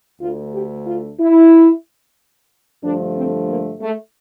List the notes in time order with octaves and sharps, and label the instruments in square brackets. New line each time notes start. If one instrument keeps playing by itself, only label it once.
[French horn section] D2 D3 A3 F4
G4
F4
E4
G2 D3 F3 A3 D4
C4
A#3
A3